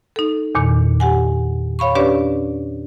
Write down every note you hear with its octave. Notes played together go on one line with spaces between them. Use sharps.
D#4 A4
E2 A#2 D#3
G4 F#5 G#5
C#5 F5 B5 C#6
C#4 D4 G4 B4 C#5 D5